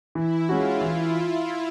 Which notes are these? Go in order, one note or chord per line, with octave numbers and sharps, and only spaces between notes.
E3 E4
G#3 C#4 F4 F#4
E3